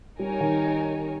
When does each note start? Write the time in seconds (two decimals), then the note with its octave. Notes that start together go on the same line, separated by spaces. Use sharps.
0.19 G3 D#4 A#4 C#5 G#5
0.40 D#3